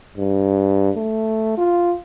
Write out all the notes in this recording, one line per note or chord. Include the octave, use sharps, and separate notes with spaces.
G2
A3
F4